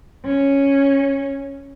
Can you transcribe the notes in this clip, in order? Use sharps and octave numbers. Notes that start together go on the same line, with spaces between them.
C#4